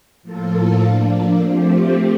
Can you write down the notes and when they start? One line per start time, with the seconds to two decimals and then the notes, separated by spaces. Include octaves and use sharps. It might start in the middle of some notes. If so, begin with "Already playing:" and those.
0.23 A2 F3 A#3 F4 A4
0.82 F3 A#3 D4
1.41 F3 A3 C4 G4